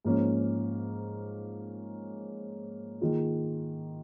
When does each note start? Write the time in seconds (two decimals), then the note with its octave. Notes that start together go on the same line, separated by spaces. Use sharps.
0.05 G#2 F3 A#3 C#4
3.01 D#3 A#3 F4 G#4